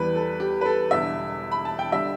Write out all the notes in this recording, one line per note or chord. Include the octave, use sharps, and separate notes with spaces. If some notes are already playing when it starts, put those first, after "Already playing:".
Already playing: E2 E3 G3 B4
A4
G4
B4
A4
E1 E2 D3 G3 E5
B5
A5
G5
D3 G3 E5